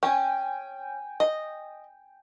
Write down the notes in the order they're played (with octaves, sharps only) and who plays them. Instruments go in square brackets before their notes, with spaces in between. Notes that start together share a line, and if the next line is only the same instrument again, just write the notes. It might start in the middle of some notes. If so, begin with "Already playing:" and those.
[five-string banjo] C#4 [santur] G5 G#5
[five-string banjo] D#5